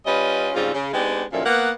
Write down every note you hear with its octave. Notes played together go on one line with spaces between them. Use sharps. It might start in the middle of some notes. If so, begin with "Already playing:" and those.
G3 C#4 F4 B4 D#5
G#2 C#3 G3 C4 F4
C#3
G#3 B3 C4 D4 D#4 G4
F#2 A#2 D3 D#3 F3 E5
A#3 B3 F#5